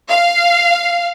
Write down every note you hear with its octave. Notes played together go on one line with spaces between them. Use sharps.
F5